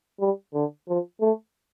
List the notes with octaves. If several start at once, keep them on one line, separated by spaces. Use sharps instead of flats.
G3
D3
F3
A3